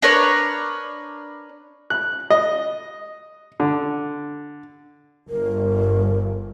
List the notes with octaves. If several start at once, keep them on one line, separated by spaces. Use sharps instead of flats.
D4 A#4 B4 C#5
F#6
D#5
D3
G1 A#4